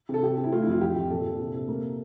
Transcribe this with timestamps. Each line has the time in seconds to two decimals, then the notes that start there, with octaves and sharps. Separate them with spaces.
0.09 C3
0.14 A4
0.23 C3 G4
0.38 C3
0.44 E4
0.52 A3 F4
0.62 E4
0.67 F2 F4
0.81 F2 G4
0.96 F2
1.10 A#2 A4
1.25 A#2
1.40 C3
1.54 C3
1.68 A#3